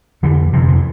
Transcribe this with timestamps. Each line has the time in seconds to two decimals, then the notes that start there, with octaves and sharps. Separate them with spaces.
0.23 F2 D3 E3
0.53 F2 C3 F3
0.68 E3